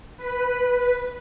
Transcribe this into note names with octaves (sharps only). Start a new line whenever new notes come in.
B4